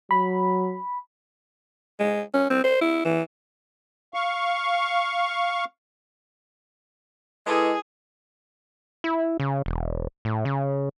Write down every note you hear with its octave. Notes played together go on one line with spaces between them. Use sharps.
F#3 B5
G#3
C#4
C4
C5
E4
E3
F5 C#6
G#3 E4 G#4 A4 B4 D#5 D6
E4
C#3
E1
A2
C#3